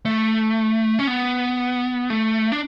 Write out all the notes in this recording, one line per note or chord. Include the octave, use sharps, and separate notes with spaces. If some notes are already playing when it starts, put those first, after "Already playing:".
A3
C#4
B3
A3
D4